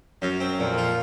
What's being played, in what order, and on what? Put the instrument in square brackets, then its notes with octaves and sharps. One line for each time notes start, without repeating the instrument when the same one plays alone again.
[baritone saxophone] F#2 [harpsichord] F#3
[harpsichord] C4
[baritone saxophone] F2 [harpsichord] A#2
[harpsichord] F4